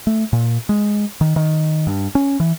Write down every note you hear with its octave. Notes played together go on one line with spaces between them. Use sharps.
A3
A#2
G#3
D#3
D#3
G2
C#4
E3